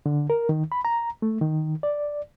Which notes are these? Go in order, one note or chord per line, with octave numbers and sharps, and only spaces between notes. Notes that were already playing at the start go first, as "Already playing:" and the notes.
D3
A#4
D#3
B5
A#5
A3
D#3
D5